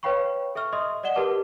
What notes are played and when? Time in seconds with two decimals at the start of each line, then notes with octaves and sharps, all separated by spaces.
0.03 B4 C#5 F5 G5 B5 C#6
0.55 A4 E5 C#6 F6
0.73 D#5 E5 C6 D#6
1.03 D5 D#5 F#5 E7 G7
1.15 G4 A#4 B4 A5 D6